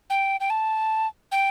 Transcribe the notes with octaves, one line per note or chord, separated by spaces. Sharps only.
G5
G5
A5
G5